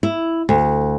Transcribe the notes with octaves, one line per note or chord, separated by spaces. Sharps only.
E4
D2